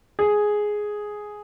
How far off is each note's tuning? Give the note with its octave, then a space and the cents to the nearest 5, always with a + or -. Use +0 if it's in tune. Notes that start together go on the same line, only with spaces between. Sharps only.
G#4 +5